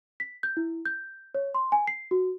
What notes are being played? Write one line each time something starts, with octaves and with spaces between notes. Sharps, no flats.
B6
G6
E4
G6
C#5
C6
G#5
C7
F#4